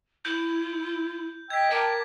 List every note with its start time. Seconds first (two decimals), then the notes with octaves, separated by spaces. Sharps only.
0.25 E4 G6
1.50 D#5 G5 E6 G#6 B6
1.71 A#4 G5 A5 D6